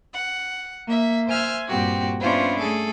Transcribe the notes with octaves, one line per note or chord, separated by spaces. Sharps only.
F#5
A#3 E5
C5 E5 G#5 E6 F6 G6
G2 A#2 C4 F#4 G4
B3 C#4 D4 E4 F4 C5
A3 G#4 A4